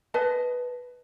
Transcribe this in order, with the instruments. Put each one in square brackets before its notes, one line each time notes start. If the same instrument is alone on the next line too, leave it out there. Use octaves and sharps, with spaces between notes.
[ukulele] B4 D#5 A5